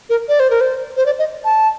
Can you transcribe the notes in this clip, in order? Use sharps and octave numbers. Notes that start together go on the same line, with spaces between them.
A#4
D5
C5
A#4
C5
C5
D5
D#5
A5